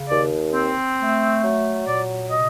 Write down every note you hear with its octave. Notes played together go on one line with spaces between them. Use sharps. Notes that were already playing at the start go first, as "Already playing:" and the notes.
Already playing: C#3
D#2 D5
C4
A3
F#3
A#2 D5
C3 D#5